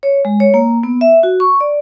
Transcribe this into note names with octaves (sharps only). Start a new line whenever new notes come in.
C#5
G#3
C#5
A#3
B3
E5
F#4
C#6
D5